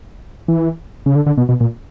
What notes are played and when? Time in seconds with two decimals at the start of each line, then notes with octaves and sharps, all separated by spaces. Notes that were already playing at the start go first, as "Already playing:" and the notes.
0.48 E3
1.06 C#3
1.16 D3
1.26 D3
1.37 B2
1.49 B2
1.60 A#2